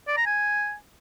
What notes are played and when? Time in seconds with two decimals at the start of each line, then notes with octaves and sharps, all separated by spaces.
0.08 D5
0.17 A#5
0.26 G#5